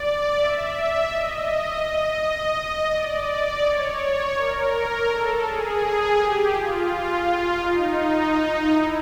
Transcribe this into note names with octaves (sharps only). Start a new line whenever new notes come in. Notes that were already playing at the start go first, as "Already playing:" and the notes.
Already playing: D5
E5
D#5
D#5
D5
C#5
A#4
A4
G#4
G4
F4
F4
D#4
E4